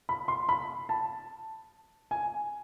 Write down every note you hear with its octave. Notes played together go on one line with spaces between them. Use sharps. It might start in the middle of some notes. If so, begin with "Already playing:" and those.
B5
C6
B5
A5
G#5